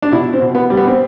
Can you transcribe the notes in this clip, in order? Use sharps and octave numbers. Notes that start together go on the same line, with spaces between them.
D4
B2 E4
C4
B2
B3
G3
B3
C4